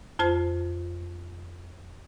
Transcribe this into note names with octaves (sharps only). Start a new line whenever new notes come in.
F2 F4 C5 A5